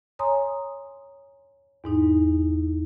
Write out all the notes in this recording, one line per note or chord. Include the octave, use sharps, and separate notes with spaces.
C#5 G#5 A#5 C6 D#6
E2 G#2 D#4